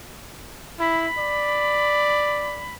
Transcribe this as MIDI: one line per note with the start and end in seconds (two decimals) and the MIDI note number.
0.79 1.08 64
0.79 2.74 83
1.18 2.69 74